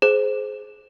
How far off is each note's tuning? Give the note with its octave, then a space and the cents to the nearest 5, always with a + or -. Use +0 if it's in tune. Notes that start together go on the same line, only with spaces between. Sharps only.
G#4 +20 C5 +0